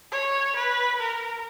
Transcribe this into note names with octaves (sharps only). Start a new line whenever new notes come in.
C#5
B4
A#4